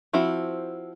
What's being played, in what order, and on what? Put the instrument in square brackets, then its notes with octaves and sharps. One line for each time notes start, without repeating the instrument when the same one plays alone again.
[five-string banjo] F3 C4 E4 F#4